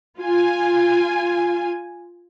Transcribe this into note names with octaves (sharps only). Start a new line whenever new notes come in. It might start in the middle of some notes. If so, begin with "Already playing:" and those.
F4 G#5